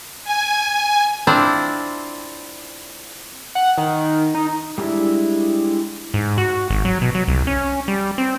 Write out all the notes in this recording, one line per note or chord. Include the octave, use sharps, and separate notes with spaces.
G#5
C4 D4 E4 F4 D5
F#5
D#3
D#4
G3 G#3 D4 E4 E5
G#2
F#4
G#1
F#3
B2
F#3
C2
C#4
G3
C4